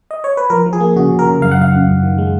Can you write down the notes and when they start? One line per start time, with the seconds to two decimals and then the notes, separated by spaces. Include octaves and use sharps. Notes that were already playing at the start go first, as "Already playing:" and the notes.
0.11 D#5
0.24 C#5
0.37 B4
0.50 F3 A#4
0.66 F3
0.73 G#4
0.80 A#3
0.96 C#3 F#4
1.11 C#3
1.19 A#4
1.26 C#3
1.42 F#2 F5
1.51 F#5
1.58 F#2 F5
1.72 F#2
1.88 F#2
2.03 D#3
2.18 G#3